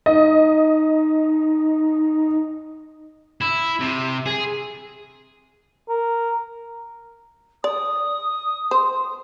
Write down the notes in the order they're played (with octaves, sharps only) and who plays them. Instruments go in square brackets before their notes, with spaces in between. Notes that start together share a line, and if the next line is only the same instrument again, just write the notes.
[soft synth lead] D#4 [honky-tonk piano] D#5
[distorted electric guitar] E4
C3
G#4
[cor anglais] A#4
[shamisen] D5 [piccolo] D#6
[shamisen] C5